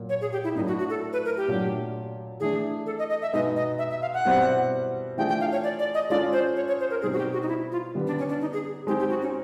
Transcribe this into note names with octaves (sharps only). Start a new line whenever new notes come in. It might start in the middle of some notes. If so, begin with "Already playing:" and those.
Already playing: A#2 F#3 A#3
C#5
G#4
G4
E4
A2 F#3 A#3 D4 D#4
F#4
F#4
A4
B4
A#4
G4
A#2 F#3 A3 D4
E3 A3 D4 G#4
A4
D#5
D#5
E5
B2 G#3 B3 D#4 D#5
D#5
E5
E5
F5
F#5
B2 G3 C4 E4
E3 A3 D4 F4 G#4 G5
G5
F5
C#5
D5
D5
D#5
G#3 C#4 F4 A4 D5
C5
C#5
C#5
C5
A#4
B2 G3 C4 D#4 G#4
F#4
G4
F#4
D#4
E4
F4
D3 G3 B3
D4
C#4
D4
D#4
G#4
G#3 C4 D#4 G4
G4
F#4
C#4